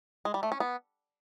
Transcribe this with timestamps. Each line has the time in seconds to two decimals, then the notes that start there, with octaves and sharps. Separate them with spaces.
0.25 G#3
0.34 G3
0.43 A3
0.52 C#4
0.60 B3